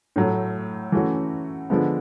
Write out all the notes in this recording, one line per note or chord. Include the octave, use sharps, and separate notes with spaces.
A2 F#3 A3
E3 A3 C#4 F#4
D3 F3 G#3 B3